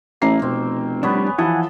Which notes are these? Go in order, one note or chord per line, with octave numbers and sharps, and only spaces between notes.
A1 A#3 E5 A#5 C7
F1 B2 C4
G3 B3 D4 B4 C#5
G#5
E3 F3 A4 F#5 G#5 D#6